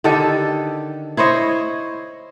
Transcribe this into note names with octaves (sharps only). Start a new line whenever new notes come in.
D3 D#3 G4 A4
E4 C5 C#5 D#5